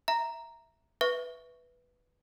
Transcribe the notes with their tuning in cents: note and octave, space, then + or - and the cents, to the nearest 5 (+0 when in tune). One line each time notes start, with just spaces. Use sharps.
E5 +0 A#5 +0
B4 +0 E5 +0 C#6 +0